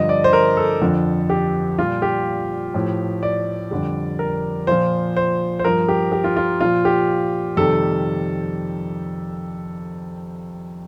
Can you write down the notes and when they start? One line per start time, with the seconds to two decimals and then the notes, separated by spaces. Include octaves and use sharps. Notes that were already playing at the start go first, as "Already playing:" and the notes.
Already playing: G2 D3 F3 D#5
0.09 D5
0.24 C5
0.33 A#4
0.57 A4
0.82 F2 D3 F3
1.30 G4
1.78 A#2 G3 F4
2.02 G4
2.74 A2 F3
3.23 D5
3.71 F2 D3 G3
4.19 A#4
4.67 A#2 F3 C5
5.17 C5
5.59 C5
5.64 G2 F3 A#4
5.88 G4
6.12 G4
6.24 F4
6.37 F4
6.60 A#2 F3 F4
6.85 G4
7.57 F2 C3 D#3 G3 A4